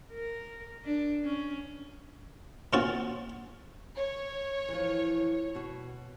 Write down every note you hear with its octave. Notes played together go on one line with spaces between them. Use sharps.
A#4
D4
C#4
A#2 C4 C#4 F4 F#4 A5
C#5
E3 F3
B2 F#4